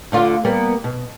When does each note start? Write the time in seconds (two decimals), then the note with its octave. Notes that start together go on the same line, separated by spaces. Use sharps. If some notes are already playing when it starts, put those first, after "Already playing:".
0.12 D2 D3 F4
0.45 G3 A#3 B3
0.84 B2